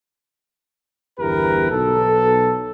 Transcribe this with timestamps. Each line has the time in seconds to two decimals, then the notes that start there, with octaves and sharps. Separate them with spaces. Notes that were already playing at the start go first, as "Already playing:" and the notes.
1.19 G1 E2 E4 G4 A#4 B4
1.71 B1 A4